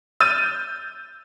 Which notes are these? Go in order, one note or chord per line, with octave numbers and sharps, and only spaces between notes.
E6 F6 G6 A6 D#7